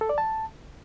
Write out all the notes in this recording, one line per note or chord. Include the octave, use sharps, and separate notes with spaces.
A4
D5
A5